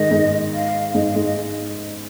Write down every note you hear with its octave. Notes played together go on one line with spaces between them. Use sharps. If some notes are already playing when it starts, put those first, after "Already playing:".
Already playing: G#2 D#3 G#3 D#5
G#2 G#3
F5
G#2 G#3 D#5
F5
G#2 G#3 D#5
D#5